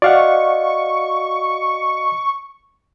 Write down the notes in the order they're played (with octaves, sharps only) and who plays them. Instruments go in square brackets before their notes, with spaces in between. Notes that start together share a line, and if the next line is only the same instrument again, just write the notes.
[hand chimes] F#4 D#5 [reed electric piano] D5 F5 F#5 [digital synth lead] C#6